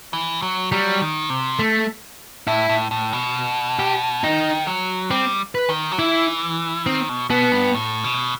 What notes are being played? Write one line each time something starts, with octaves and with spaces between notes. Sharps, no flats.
E3
F#3
F#3 G3
D#3
C3
A3
A2 E4
A2
A2
B2
G4
D#3 D#4
F#3
G3 C4
B4
D#3
F#3
E3 E4
D#3 C4
B2
B2 B3
G2
A2
B2